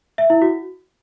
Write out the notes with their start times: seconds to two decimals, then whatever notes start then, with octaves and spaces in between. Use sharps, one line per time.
0.18 E5
0.30 E4
0.42 F#4